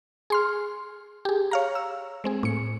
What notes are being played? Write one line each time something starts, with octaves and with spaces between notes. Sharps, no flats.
G#4 C6 F6
G4 G#4
C#5 F5 A#5
E6
G#3 C4 G#4
A2 C#7